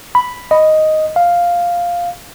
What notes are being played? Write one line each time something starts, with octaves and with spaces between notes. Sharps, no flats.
B5
D#5
F5